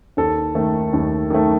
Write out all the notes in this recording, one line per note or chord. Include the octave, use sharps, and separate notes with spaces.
D#2 A4
D#3 A3
D#2
D#3 A3